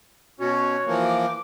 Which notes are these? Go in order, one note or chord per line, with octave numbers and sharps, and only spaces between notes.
B2 C#4 F#4 C#5
E3 F3 A#3
D6